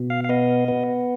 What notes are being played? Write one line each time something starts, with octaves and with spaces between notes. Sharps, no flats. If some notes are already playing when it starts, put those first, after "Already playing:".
Already playing: B2
F5
F5
B3 D#5
B3